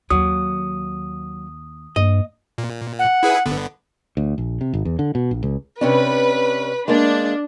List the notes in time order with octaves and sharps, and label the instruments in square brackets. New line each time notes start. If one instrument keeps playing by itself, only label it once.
[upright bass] D#2 [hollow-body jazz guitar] F#3 [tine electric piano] D#6
[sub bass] G2 [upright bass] A#3 [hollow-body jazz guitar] D#5
[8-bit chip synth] A#2
[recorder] F#5
[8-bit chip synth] E4 G#4 B4
G1 D3 B3
[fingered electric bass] D2
A#1
C3
G#1
E2
D3
B2
A#1
C#2
[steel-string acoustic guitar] C3 C#4 D4 [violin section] B4
[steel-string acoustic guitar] G#3 A#3 [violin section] D4